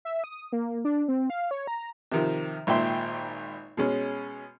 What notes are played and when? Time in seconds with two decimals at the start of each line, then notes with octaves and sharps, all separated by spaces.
0.05 E5
0.24 D#6
0.52 A#3
0.85 D4
1.08 C4
1.30 F5
1.51 C#5
1.67 A#5
2.12 C3 D#3 F3
2.67 G#1 A#2 E5 G5 C6
3.77 B2 G#3 C#4